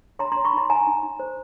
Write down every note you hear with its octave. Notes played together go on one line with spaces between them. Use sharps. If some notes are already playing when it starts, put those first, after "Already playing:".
C#5 A#5 C6
C#5 A#5 C6
B5 C#6
D#4 A#5 C6
D#4 G#5 A#5
D#4
D#4
C5